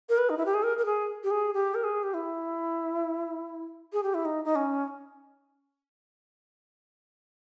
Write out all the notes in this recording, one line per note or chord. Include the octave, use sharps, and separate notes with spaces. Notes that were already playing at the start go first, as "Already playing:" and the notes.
A#4
B4
D#4
E4
G4
G#4
A#4
A#4
G#4
G4
G#4
G4
A#4
G#4
G4
E4
G#4
G4
E4
D#4
D#4
C#4